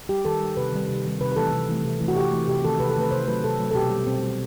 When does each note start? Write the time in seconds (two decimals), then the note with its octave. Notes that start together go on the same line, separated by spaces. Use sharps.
0.09 G3 G4
0.25 D#3 A4
0.41 G3
0.57 C3 B4
0.72 D#3 G3
0.89 C3
1.05 D#3 G3
1.21 C3 B4
1.32 B4
1.36 E3 A3 A4
1.53 C3
1.69 E3 A3
1.85 C3
2.01 E3 A3
2.08 F#4
2.16 C3 G4
2.31 E3 A3
2.47 C3 G4
2.64 D#3 A3 A4
2.80 C3 B4
2.90 A4
2.96 D#3 A3 B4
3.11 C3 C5
3.27 F#3 A3 B4
3.44 C3 A4
3.59 F#3 A3
3.71 A4
3.75 B2 G4
3.91 G3
4.07 B2 C4
4.23 G3